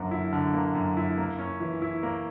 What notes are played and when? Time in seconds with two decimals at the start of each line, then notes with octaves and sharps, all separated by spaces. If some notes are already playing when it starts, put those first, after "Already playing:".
Already playing: F#2 D3 A#3
0.11 E4
0.33 D3
0.54 A#3
0.75 F#2
0.97 E4
1.18 A#3
1.39 C#4
1.60 E3
1.82 E4
2.03 A#3